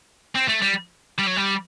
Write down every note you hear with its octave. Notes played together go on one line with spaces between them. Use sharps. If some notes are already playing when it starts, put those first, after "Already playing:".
C4
A3
G3
G3
F#3
G3